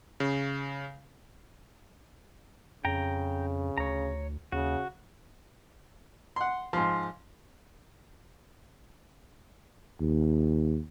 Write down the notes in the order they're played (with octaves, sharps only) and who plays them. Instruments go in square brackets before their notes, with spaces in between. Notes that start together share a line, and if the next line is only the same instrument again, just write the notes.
[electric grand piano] C#3
[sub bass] F2 [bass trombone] C#3 [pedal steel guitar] G5 A#5
[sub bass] D2 [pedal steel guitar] C#5 A#5
[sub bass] D#2 [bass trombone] C#3 [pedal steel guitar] F#4
[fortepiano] F#5 C6
[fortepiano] G#2 F3 [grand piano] C6
[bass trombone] D#2